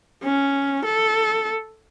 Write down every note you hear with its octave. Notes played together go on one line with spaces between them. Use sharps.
C#4
A4